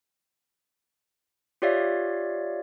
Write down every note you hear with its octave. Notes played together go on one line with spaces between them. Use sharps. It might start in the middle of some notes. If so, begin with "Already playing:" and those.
F4 G4 C#5 D5 E5 F5